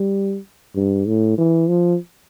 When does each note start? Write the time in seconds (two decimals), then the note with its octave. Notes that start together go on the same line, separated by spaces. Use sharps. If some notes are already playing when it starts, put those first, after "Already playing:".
Already playing: G3
0.76 G2
1.07 A2
1.38 E3
1.69 F3